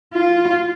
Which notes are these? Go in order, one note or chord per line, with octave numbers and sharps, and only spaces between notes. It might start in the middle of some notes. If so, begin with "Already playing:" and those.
F4